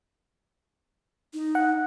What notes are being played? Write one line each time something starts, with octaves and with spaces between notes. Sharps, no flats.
D#4
F#5